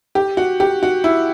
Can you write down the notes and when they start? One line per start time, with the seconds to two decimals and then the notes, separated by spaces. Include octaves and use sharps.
0.15 G4
0.37 F#4
0.60 G4
0.83 F#4
1.04 E4